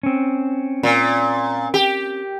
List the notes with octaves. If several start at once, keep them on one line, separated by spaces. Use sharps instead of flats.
C4 C#4
A#2
G4